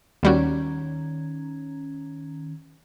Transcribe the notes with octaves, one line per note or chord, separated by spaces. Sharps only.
D#2 D#3 G3 C#4 F#4